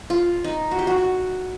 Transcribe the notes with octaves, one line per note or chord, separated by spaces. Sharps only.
F4
D#4
F#4
G4
F#4
F#4